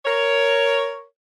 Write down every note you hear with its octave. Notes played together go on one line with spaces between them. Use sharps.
A#4 C#5